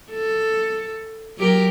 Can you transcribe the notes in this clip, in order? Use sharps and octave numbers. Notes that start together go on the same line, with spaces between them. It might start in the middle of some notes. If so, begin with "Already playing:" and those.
A4
F#3 G4 A#4